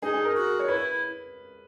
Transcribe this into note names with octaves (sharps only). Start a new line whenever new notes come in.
D#4 G#4
G#4
A#4
F#4
C#5
E4 B4